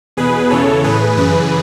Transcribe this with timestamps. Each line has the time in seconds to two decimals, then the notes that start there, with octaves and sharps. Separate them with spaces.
0.17 E2 B2 G#4 B4
0.50 E2 C#3 E3 A4 C#5
0.84 A2 E3 G#4 B4
1.17 F#2 C#3 E3 G#4 B4